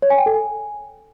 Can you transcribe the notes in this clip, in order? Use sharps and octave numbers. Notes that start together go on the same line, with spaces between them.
C#5
G#5
G5
A4
G#5